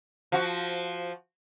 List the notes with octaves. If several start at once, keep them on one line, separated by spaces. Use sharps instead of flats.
F3 F#4